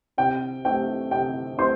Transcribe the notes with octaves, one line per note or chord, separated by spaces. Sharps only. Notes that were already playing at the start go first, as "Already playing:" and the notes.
C3 G5
A3 C4 G5
C3 G5
A3 C4 C5 C6